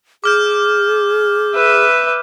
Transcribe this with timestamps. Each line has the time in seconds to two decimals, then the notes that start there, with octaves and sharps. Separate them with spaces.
0.24 G#4 D6 F6 G6
1.55 B4 E5